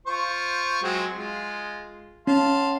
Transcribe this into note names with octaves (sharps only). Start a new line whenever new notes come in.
F4 C5 C#6
F#3 G#3 C4
G#3 F4
C#4 F5 A5 C6